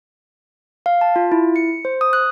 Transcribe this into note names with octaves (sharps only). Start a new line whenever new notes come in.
F5
A5
F4
E4
C#7
C5
D#6
F#6